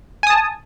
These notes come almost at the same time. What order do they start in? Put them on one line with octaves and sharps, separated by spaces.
G#5 D#6 A5